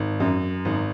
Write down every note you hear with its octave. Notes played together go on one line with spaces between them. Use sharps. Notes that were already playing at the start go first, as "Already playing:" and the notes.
Already playing: G#1
F#2
G#1